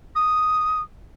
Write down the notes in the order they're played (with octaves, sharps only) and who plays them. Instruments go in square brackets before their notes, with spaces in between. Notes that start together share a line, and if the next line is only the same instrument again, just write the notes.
[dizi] D#6